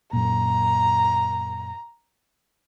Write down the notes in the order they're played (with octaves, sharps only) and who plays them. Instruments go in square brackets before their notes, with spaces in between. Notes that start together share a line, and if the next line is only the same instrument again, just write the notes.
[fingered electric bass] F#2 A#2 [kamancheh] A#5